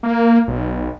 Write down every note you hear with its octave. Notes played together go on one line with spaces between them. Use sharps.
A#3
B1